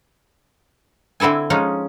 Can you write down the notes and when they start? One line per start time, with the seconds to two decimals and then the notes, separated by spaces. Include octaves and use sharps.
1.20 D3 C4 E4 A4 G#5
1.50 F3 G#3 C#4 D#4